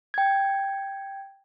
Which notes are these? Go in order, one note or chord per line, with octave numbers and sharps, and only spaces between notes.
G5 G#6